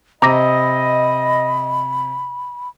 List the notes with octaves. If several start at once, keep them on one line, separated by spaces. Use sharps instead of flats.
C3 D#5 A#5 B5 D6 A#6